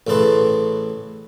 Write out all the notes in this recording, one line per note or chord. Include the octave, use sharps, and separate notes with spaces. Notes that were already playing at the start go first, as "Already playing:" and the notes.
A1 A2 C#3 A4 B4 C6